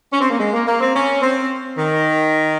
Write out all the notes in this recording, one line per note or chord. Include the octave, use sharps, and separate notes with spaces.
C#4
C4
A#3
G#3
A#3
A#3
C4
C#4
C4
D#3